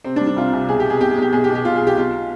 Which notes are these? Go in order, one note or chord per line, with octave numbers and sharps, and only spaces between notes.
C3 C4
D4
G3
D4
C2 F4
C2
B1 G#4
G4
B2 G#4
B1 G4
G#4
B1 G4
B1 G#4
G4
B2
G4
B1 F4
G#4
B1
G4
B1 F4